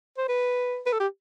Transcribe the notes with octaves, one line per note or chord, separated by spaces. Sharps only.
C5
B4
B4
A4
G4